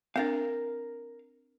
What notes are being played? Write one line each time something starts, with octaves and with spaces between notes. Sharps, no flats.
C4 D4 A#4 F5